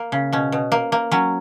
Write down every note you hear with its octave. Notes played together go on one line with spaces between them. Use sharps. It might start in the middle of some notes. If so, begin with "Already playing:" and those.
Already playing: A#3
C#3
B2 C#4
B2
A#3
A#3
F#3 C#4